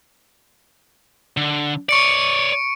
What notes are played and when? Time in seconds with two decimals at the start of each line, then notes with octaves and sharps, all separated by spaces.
1.37 D3
1.89 C#5 D5 C#6 C#7 D7